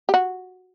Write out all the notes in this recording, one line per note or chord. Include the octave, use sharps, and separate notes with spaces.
G4
F#4